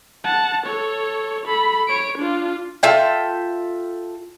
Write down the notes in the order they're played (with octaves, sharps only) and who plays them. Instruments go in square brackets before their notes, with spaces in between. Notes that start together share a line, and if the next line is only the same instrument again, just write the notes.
[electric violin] F#5 A5
A4 C#5
A4 B5
C#5 D7
D4 F4
[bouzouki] F4 A4 E5 G5